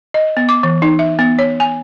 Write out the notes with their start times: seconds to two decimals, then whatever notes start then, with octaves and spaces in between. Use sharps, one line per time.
0.14 D#5
0.37 B3
0.49 D6
0.63 E3
0.82 D#4
0.99 E5
1.19 B3
1.39 C#5
1.60 G#5